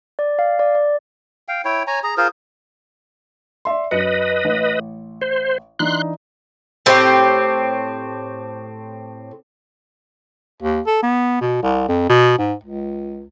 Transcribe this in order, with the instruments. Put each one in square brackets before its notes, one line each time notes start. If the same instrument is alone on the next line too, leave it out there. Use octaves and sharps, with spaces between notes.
[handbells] D5
F5
D5
D5
[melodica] F5 G5
E4 C#5 G5
C#5 G#5 A#5
G#4 A#5
F4 G#4 A#4 C5
[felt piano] D5 E5 C6
[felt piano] F#2 C#7 [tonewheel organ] B4 D#5
[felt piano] A1
[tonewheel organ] C5
[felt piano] E3 D4 D#4 [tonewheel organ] C6 F#6
[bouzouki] A2 C4 G4
[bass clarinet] D#2
A4
B3
B2
C2
F2
B2
G#2
C#2